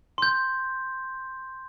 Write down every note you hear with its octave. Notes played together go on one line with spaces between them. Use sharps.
C6 G6